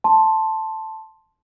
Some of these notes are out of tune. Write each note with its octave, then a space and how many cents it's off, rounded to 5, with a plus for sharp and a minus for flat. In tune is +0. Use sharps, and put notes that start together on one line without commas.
A5 +0 C6 +5